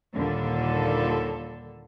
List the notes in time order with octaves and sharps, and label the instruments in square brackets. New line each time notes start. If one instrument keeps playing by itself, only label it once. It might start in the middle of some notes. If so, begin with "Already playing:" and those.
[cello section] D#2 A#2 D3 G3 A4